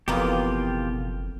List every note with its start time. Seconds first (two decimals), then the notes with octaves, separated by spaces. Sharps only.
0.08 F#1 F2 B2 E3 A#3 B3 F4 G4